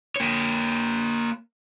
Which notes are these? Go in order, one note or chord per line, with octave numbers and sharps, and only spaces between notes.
A#3 C#5